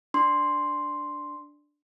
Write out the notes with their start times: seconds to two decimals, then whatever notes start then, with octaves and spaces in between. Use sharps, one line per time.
0.14 D4 C6